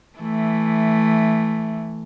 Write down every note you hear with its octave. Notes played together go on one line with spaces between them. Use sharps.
E3 A3